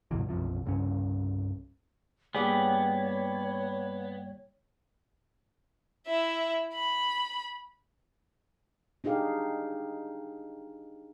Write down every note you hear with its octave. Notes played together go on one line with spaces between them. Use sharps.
C#2 G2 B2 E3
B1 F#2 C3 F3
C2 G2 C#3 C#4
G2 A#3 B3 G4 G#4 C#5 D5 G5
E4 E5
B5
D4 D#4 G4 G#4 F5